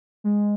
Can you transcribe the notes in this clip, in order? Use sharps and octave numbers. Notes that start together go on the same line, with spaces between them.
G#3